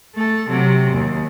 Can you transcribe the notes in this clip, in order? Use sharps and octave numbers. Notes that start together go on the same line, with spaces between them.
A3 A4
C3 F#3
D#2